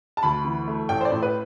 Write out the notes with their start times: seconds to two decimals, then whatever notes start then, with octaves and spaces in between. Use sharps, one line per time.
0.17 A5
0.23 D2 B5
0.45 E3
0.67 A3
0.89 A1 G5
1.01 C5
1.05 D5
1.11 A2
1.23 B4